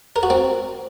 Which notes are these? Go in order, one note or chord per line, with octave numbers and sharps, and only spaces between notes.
A#4
F#4
C4